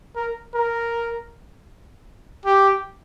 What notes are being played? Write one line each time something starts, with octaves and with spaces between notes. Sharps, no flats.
A#4
A#4
G4